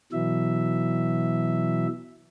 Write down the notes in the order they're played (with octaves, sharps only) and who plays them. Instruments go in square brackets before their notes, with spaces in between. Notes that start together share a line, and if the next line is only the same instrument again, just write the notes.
[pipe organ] B2 E3 F#3 E5